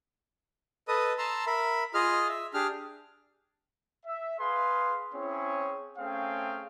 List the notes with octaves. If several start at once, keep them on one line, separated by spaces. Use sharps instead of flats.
A4 B4 D#5 D#6
A5 A#5 C6 E6
A#4 E5 B5
F4 G#4 D#5 F6
E5
D4 G4 G#4 F6
E5
G#4 B4 F5 C6
C4 C#4 E4 G#4 C#5
A3 C4 C#4 G#4 F5 G5